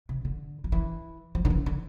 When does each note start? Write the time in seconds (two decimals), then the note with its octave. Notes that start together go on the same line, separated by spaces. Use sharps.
0.09 C3
0.25 D3
0.64 F3
0.72 E3
1.35 F3
1.45 D3
1.50 E3
1.66 D3